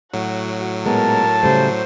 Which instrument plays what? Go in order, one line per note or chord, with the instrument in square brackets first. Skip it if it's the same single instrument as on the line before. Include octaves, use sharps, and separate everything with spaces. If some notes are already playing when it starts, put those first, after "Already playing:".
[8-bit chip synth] A2 F#3 [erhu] F#4
[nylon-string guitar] A#2 G#3 B3 [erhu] A#4 [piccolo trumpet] A5
[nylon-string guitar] C#3 G3 A3 [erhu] C5